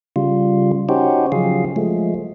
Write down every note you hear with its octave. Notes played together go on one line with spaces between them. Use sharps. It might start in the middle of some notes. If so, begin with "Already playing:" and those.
C#3 G3 F4
C#4 D#4 F#4 G4 C5
C#3 F3 F#3 G#4 F5
F3 G#3 A3